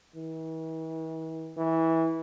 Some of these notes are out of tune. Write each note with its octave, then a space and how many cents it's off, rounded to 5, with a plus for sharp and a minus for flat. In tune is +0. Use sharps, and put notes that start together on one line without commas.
E3 -40
E3 -20